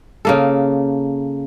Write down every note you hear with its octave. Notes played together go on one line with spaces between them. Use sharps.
C#3 A#3 A4